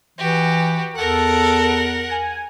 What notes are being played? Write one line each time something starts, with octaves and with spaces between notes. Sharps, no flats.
E3 F#4 G4
E2 A4 A#4 F#5
G#5